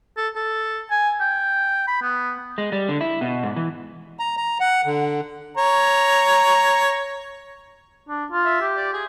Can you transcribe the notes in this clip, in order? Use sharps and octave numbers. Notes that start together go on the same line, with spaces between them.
A4
A4
G#5
G5
B5
B3
G#3
G3
D3
E4
B2
G#2
E3
A#5
A#5
F#5
D3
C#5 A#5
D4
F4
E5
G4
D5
G#4